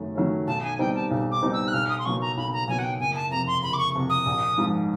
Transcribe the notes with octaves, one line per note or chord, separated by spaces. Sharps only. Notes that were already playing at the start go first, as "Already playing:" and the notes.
Already playing: F#2 D#3 F#3 A3
D#3 F#3 A3 C#4
B1 A5
G#5
B2 G3 C4 D#4 G5
A5
B1
D6
B2 G3 C4 D#4
E6
F#6
B1 F6
D#6
C6
B2 F#3 A#3 C#6
A#5
B1 B5
A#5
B2 F#3 A#3 G#5
F#5
G5
F#1 G#5
A5
F2 C3 A#5
C6
F#1 B5
D6
C#6
F2 C3
D#6
A#1
G#2 F3